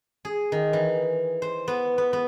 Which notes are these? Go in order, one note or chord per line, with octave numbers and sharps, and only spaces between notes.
G#4
D#3
E3
C5
B3
B3
B3